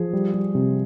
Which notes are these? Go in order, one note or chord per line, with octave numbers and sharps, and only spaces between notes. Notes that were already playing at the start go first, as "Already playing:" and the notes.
Already playing: F3 G#4
G3
G3
C3